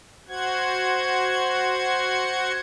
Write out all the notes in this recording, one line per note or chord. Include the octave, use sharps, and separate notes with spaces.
F#4 C5 F#5 G#6